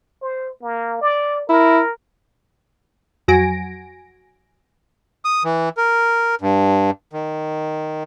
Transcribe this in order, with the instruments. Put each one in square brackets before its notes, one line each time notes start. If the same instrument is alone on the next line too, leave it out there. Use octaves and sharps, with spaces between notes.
[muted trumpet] C5
A#3
D5
[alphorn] E4 [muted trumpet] A#4
[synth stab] F2 F#3 F#4 G#5 A#6 D7
[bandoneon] D#6
E3
A#4
G2
D#3